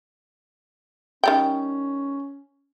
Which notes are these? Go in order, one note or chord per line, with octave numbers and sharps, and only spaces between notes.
D#3 G3 C#4 G5